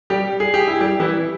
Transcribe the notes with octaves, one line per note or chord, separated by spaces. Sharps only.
G3 G4
G#4
G4
E4
G3 G4
E3 E4